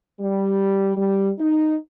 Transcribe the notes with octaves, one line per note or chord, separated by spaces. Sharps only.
G3
G3
D#4